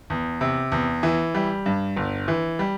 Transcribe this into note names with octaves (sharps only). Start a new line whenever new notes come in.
E2
C3
E2
E3
G3
G2
G1
E3
G3